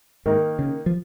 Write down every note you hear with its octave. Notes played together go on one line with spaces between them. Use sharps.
G#2 D#3 A#3 D#4 A#4
C#3
F3